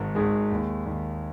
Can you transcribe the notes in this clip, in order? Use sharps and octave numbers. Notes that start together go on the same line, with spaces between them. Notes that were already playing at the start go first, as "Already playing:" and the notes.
Already playing: G#1 G#2 D#3
G#1 G#2 D#3 G#3 G#4
D#2 D#3
D#2 D#3